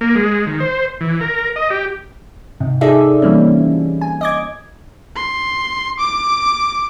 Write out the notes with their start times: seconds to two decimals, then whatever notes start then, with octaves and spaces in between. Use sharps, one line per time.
0.01 A#3
0.15 G#3
0.47 D#3
0.60 C5
1.01 E3
1.21 A#4
1.56 D#5
1.70 G4
2.60 G#2 C3
2.81 D#4 G#4 A4 D5 E5
3.22 E3 G3 A#3 C4 C#4
4.01 G#5
4.21 D#5 D6 G#6
5.16 C6
5.99 D6